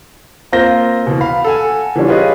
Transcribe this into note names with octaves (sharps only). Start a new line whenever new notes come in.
A#3 C4 F4 C5 A#6 G7
B2 E3
F5 B5
A4 F#5 G#5
E3 F3 G3 C#4 D4
F4 G4 G#4 B4 C#5 D#5